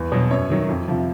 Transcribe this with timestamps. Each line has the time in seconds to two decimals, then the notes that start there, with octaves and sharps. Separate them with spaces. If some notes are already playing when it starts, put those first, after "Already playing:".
Already playing: E2
0.12 B2 F#3
0.31 F#2 C#5
0.50 D#3 F#3
0.69 F2
0.88 C3 F3